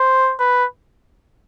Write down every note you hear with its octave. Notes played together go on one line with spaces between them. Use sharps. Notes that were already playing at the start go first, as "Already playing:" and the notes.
Already playing: C5
B4